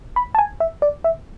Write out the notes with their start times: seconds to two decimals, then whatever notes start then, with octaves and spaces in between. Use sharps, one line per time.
0.16 B5
0.35 A5
0.38 G#5
0.60 E5
0.82 D5
1.04 E5